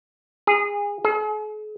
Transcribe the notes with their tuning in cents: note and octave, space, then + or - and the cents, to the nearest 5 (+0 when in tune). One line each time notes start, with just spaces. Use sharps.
G#4 -25
G#4 +45